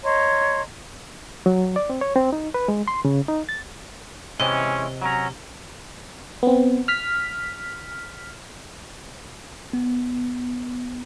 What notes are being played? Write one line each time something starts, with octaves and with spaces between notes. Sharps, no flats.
C#5 D#5 A#5 C6
F#3
D5
C4
C#5
C4
D#4
B4
G#3
C6
C#3
D#4
A6
C3 E3 G#3 C#4 D#5
F#3 C#4 A#5
B3 C4
F6 B6
B3